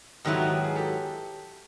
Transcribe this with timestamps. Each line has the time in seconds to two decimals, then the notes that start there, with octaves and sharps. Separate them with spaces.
0.25 G#2 D#3 F#3 B3 E4 G4 A4
0.40 F#4
0.52 G4
0.64 G#4
0.75 G4 A4